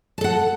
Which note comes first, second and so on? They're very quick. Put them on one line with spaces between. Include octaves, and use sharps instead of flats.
A5 A4 F#5